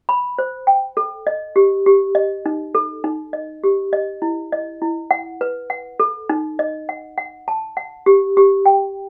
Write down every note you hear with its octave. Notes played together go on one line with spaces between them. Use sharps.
B5
C5
G5
A4
D#5
G4
G4
D#5
D#4
A4
D#4
D#5
G4
D#5
E4
D#5
E4
F#5
B4
F#5
A4
D#4
D#5
F#5
F#5
A5
F#5
G4
G4
G5